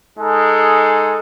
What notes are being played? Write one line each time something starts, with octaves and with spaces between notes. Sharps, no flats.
G#3 D#4 G#4 A4